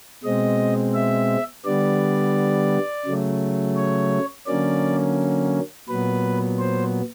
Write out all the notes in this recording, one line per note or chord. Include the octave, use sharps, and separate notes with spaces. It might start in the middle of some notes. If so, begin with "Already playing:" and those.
B2 G#3 C4 D#5
E5
D3 G3 B3 D5
C#3 F#3 A3
C#5
D3 F#3 A#3 C#4 D5
A#2 F#3 B3 B4
C5